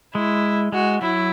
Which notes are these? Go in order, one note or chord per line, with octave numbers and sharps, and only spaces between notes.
G#3 E4
G#3 F#4
F#3 E4